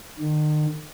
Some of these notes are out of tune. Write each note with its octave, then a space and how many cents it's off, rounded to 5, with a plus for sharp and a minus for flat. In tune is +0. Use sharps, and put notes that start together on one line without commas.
D#3 -40